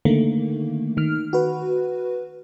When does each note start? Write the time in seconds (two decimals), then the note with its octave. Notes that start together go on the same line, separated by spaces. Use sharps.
0.05 D3 D#3 A3 A#3
0.97 D#3 F6
1.33 F#4 B4